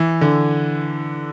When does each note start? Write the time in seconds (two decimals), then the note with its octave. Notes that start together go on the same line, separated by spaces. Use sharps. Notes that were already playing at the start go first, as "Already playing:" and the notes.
Already playing: E3
0.21 D3